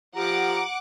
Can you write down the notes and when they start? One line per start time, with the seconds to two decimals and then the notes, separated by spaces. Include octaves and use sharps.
0.16 F3 G4 F#5 A#5 D6